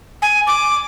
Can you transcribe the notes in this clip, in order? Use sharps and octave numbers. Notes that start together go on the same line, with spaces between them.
G#5
D6